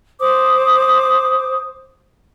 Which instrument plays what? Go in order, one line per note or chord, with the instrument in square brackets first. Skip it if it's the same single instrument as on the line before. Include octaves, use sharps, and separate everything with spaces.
[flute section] C5 D6 D#6